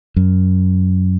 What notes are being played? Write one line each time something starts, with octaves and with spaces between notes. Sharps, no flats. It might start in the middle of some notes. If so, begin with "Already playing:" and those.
F#2